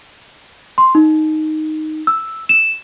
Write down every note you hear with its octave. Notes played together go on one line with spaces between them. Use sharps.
C6
D#4
E6
E7